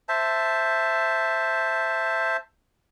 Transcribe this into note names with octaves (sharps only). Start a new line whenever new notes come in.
C5 E5 A5